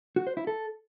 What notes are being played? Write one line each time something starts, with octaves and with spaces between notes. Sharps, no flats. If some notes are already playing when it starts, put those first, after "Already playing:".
F#4
C5
E4
A4